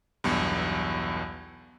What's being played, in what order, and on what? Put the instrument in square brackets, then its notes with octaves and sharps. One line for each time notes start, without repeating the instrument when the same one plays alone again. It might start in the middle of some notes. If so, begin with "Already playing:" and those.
[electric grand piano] B1 E2 G2